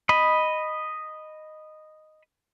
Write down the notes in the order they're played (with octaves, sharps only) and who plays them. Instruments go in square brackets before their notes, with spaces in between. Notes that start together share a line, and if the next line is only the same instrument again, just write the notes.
[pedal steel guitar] D#5 B5